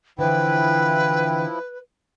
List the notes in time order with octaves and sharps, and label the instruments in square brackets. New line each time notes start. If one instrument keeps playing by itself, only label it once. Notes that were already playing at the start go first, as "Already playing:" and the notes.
[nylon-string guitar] D3 E3 [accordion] F3 E4 [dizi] B4 [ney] G5